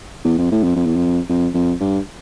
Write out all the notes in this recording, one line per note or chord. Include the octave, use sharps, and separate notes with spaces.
E2
F2
A2
F2
F2
E2
F2
F2
F2
G2